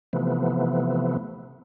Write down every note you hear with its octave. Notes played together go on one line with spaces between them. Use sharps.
C3 E3 F3 A3 B3